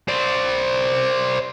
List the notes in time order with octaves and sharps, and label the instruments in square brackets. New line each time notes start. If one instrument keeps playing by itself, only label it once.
[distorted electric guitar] C5 D5